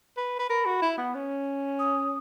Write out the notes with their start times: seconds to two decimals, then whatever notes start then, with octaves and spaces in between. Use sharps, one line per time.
0.17 B4
0.39 B4
0.49 A#4 B5
0.65 F#4
0.82 E4
0.98 B3
1.15 C#4
1.79 D#6